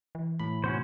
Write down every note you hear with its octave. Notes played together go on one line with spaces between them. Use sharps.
E3
A2 B5
C3 D#3 B3 C#4 F#4 C5